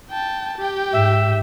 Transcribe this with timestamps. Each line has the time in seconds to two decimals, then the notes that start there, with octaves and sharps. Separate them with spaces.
0.11 G5 A5
0.58 G4 G5
0.93 G#2 E5